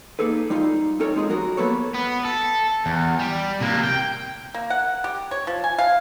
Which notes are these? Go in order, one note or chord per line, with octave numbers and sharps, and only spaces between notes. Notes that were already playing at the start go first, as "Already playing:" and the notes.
A#3 D#4 G#4 A4 B4
G3 D#4 F4
C4 D#4 A4 A#4 C#5
G#3 C4 D#4 F4 G4 G#4
F#3 G3 F#4 A#4
F#3 A#3 B3 A4 B4 C#5
B3
A4
E2
G3
C3 A#3
G5
A#3
F#5
G4
C#5
F3
G#5
F5